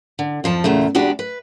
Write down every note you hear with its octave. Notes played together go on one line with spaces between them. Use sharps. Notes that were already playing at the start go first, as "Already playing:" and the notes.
D3
F2 F3 A5
E2 A#2 C#3 A3
E2 G#3 D4 F#4 G4 B4
B4